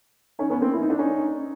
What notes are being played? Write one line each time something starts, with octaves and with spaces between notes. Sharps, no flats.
C#4 D#4
B3 C#4
A#3 C4
E4
D#4
D4
C#4 D#4